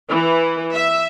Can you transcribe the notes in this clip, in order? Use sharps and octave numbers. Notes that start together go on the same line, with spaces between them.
E3
E5